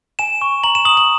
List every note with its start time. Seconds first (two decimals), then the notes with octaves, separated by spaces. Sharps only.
0.19 G#5 E7
0.42 C#6
0.64 A#5 F#7
0.75 E7
0.85 D#6 F#7
0.97 F#7